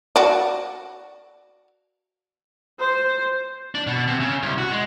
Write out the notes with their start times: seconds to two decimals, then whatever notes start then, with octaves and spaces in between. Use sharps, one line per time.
0.16 F#4 D5
2.79 C5
3.75 D4
3.87 B2
4.08 C3
4.20 C#3
4.43 C2
4.58 F#4
4.71 G#3